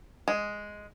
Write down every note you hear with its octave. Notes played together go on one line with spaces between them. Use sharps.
G#3